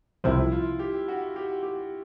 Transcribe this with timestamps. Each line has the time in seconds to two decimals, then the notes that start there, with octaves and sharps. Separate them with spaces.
0.24 C2 C3 F3 E4
0.52 F4
0.79 G4
1.08 F#4
1.36 G4
1.63 G4